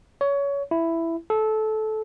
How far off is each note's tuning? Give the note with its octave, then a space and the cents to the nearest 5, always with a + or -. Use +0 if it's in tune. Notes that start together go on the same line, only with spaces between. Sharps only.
C#5 +20
E4 +5
A4 -20